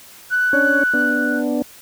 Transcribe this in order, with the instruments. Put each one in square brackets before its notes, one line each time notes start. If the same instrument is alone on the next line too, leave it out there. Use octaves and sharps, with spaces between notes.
[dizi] F#6
[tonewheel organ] C#4 D4 C#5
B3 D4